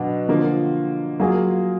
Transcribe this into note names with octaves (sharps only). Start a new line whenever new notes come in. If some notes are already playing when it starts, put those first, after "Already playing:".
Already playing: B2 F#3 D4
D3 F3 A#3 F4
F#3 A#3 F4 G#4